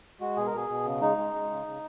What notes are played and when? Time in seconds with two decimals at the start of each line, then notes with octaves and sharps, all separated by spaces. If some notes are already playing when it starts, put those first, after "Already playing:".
0.21 G#3 F#4
0.37 B2 G#4
0.46 A#4
0.53 B2 G#4
0.69 B2
0.85 C#3
1.01 G#3 D#4
1.18 G#3
1.34 G#3
1.50 C#3
1.66 C#3